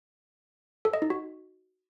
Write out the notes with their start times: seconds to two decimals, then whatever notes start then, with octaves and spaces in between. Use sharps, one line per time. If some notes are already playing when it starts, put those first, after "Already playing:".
0.85 A4
0.93 D#5
1.02 D#4
1.10 F#4